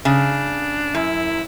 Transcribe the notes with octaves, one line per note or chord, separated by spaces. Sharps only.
C#3 D4
F#2 E4